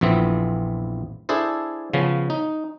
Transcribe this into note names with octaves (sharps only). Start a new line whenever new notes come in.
A#1 F2 E3 B3 C4
D4 E4 G#4 A4 C5
C#3 F3 B3 C#4
D#4